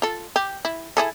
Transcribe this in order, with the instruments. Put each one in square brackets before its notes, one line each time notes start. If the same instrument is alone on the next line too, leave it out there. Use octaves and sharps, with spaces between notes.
[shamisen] F4 A4
G4
E4
E4 G#4 A4